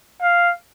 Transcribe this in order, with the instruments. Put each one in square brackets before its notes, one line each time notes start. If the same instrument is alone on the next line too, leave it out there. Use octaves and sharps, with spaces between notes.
[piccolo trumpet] F5